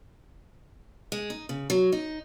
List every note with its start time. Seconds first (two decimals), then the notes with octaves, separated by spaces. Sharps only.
1.12 G#3
1.30 D#4
1.49 C#3
1.70 F#3
1.92 D#4